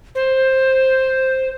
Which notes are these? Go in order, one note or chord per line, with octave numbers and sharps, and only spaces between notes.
C5